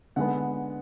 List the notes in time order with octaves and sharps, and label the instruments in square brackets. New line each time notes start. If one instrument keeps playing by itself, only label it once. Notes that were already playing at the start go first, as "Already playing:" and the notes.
[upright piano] D3 G#3 B3 F#5